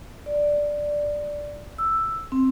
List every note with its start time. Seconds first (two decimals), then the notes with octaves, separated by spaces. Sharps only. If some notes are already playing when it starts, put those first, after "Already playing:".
0.26 D5
1.78 E6
2.32 C4